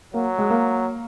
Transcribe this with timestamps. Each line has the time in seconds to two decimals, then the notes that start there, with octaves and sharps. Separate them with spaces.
0.13 F#3 A#3
0.38 G#3
0.50 A#3